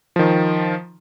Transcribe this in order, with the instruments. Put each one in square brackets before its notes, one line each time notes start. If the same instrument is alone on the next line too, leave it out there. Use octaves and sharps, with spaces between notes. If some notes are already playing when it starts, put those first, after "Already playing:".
[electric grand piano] D#3 F3